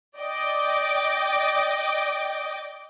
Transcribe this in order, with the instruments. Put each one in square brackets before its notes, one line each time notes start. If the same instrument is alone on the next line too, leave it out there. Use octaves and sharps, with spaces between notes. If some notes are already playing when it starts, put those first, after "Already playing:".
[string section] D5 D#5 G5 D6